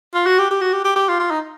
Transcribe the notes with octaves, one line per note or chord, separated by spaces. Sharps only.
F4
F#4
G4
G4
F#4
G4
G4
G4
F4
F4
D#4